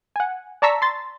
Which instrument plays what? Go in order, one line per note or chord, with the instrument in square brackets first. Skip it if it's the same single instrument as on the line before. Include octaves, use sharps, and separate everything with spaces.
[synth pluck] F#5 G#5
D5 A5 A#5 C#6 E6 B6
C6 A6